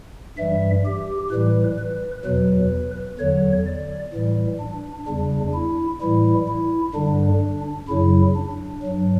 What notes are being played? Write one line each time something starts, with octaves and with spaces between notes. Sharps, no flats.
G2 E3 G3 E5
G4
A2 E3 G3 B4
B4
E2 B2 F#3 B4
E2 D3 F#3 C#5
D5
A2 E3 G3
D4
E2 C#3 G3 D4
E4
A2 E3 G3 E4
E4
G2 D3 G3 D4
F#2 C#3 F#3 E4
D4
G2 F#3